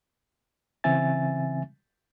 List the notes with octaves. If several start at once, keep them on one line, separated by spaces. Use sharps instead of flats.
C#3 E3 C4 E5 G#5 A6